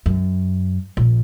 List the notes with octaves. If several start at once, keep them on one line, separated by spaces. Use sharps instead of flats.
F#2
A#1